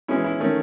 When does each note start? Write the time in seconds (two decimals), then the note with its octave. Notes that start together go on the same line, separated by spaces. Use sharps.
0.08 E3 G#3 C#4 E4
0.24 E4
0.40 D#3 A3 C#4